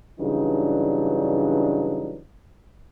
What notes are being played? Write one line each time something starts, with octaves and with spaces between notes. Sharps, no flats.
G2 C#3 E3 F#3 D4 D#4